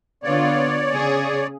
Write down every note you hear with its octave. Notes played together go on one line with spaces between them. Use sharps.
D3 B3 F4 C#5 D5
C#3 G#4